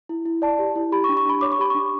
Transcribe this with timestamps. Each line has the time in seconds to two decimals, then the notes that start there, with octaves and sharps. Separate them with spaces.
0.09 E4
0.26 E4
0.42 D5 A5
0.59 G4
0.76 E4
0.92 G4 B5
1.04 C#6
1.09 D4
1.17 C#6
1.25 D4 B5
1.41 C#5 D6
1.52 C#6
1.59 G4 B5
1.70 D4 C#6